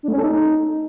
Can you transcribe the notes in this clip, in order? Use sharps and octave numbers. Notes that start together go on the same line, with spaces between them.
D4
A3
C#4
A4
D#4